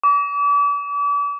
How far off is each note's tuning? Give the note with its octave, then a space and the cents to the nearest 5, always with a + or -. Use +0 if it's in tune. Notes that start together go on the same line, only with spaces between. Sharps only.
D6 -40